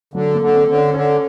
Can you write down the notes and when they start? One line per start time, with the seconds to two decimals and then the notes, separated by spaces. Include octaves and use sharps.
0.14 D3 F#3
0.35 A#3
0.41 D3
0.54 C4
0.68 D3
0.74 C#4
0.94 D3 C#4